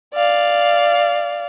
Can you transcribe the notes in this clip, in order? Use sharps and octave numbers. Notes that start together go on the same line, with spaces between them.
D5 F5